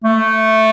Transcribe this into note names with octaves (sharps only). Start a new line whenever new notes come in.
A3